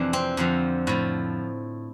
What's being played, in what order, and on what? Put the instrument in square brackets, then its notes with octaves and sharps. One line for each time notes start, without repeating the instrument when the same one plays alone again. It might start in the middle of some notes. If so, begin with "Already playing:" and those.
Already playing: [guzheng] F2 C3 E3 D4
C4
F2 D3 F3
A2 F3